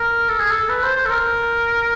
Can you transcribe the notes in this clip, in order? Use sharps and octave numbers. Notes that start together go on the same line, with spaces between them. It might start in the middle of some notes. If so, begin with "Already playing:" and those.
Already playing: A#4
A4
G#4
A4
B4
C5
C5
A4
A#4